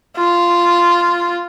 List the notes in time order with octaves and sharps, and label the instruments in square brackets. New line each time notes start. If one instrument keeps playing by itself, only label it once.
[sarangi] F4